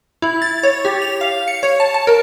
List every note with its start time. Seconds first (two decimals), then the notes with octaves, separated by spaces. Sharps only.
0.22 E4
0.42 A6
0.63 C#5
0.85 G4
1.02 F7
1.21 F5
1.48 C#7
1.63 C#5
1.80 A5
1.94 A5
2.07 A#4